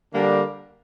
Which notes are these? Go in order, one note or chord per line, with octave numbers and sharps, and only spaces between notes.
D3 G3 A#3 D4